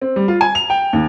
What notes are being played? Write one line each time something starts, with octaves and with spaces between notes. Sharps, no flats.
C4
G3
F4
G#5
F7
G5
D#2